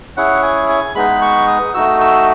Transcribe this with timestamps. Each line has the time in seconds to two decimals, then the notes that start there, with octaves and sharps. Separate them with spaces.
0.17 C#4 E4 G#4 F#5
0.43 G#5
0.69 G#5
0.95 G#3 B3 D#4 B5
1.22 C#6
1.48 D#6
1.74 A3 D#4 F#4 E6
2.01 E6